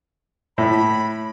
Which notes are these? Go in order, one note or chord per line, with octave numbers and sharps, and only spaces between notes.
A2 B5